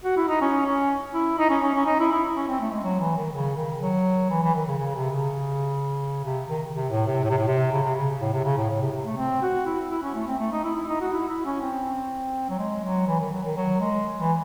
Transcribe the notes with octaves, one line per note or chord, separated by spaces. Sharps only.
F#4
E4
D#4
C#4
C#4
E4
D#4
C#4
C#4
C#4
D#4
E4
E4
C#4
C4
A3
G#3
F#3
E3
D#3
C#3
D#3
F#3
E3
E3
D#3
C#3
C#3
C3
C#3
C3
D#3
C3
A2
C3
A2
C3
A2
C3
C#3
C3
C#3
A2
C3
C#3
A2
A2
C3
C3
A3
C4
F#4
E4
E4
C#4
A3
C4
A3
D#4
E4
E4
D#4
F#4
E4
E4
C#4
C4
F#3
G#3
F#3
E3
D#3
F#3
D#3
F#3
G#3
E3